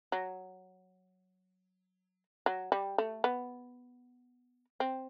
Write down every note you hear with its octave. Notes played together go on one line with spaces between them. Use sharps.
F#3
F#3
G3
A3
B3
C4